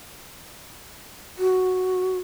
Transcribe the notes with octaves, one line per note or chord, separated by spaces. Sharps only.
F#4